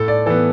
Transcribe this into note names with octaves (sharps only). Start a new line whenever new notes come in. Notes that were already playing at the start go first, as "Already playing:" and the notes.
Already playing: A2 A4
D5
E3 B3 A4